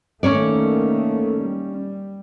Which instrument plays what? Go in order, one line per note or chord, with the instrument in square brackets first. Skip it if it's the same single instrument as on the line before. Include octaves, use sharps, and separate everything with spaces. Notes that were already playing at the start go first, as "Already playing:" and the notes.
[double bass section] D#3 A3 A#3 [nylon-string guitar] C#4 C#5 D5
[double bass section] G3